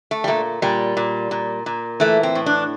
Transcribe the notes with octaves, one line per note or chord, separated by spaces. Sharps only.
A3
G3
A#2 A3
A#2 G3
A#2
A#2
A#2
E3 A3
C4
A2
D4